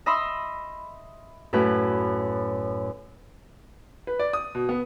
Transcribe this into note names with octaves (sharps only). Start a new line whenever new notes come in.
D#5 E5 B5 C6 D#6 E6
F#2 A2 B4
B4
D5
D#6
B2
B3